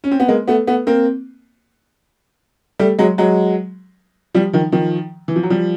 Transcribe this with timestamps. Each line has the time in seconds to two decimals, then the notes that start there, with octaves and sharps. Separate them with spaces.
0.04 C#4
0.11 C4
0.20 B3
0.28 G#3 A#3
0.47 A3 B3
0.67 A3 B3
0.87 A#3 C4
2.79 G3 A3
2.99 F#3 G#3
3.18 F#3 G#3
4.35 F3 G3
4.53 D#3 F3
4.72 D#3 F3
5.28 E3
5.36 F3
5.43 F#3
5.50 F3 G3